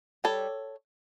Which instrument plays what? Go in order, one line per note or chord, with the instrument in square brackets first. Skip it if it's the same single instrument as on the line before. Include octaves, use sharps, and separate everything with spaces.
[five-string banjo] G3 A4 C#5